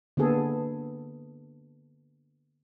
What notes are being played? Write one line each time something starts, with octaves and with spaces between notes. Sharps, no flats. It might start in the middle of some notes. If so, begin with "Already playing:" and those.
D3 A#3 B3 G#4 A4